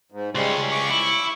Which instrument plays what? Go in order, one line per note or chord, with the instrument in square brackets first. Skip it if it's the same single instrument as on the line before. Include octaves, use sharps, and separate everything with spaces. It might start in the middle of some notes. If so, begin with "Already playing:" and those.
[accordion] G#2
[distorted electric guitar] C#2 C#4 [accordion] G3 G#3 C6
[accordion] C#6 D6
[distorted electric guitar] E4